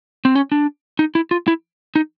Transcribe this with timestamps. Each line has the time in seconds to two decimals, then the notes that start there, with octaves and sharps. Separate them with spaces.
0.25 C4
0.35 C#4
0.52 D4
0.99 D#4
1.15 E4
1.31 F4
1.48 E4
1.96 D#4